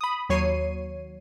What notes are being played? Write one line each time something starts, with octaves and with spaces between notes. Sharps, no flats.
B5 D#6
D#2 F#3 C#5 C#6 C7 D#7